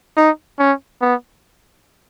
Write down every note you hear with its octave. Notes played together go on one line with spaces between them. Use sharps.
D#4
C#4
B3